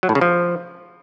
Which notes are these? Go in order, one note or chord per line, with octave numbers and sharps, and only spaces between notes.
F#3
A2
C#3
F3